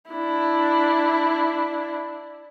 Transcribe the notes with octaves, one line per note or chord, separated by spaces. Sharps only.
D4 E4